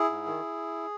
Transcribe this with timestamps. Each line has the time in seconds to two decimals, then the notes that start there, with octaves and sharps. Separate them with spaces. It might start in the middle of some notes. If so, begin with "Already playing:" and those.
Already playing: E4 G#4
0.10 G#2
0.26 D#3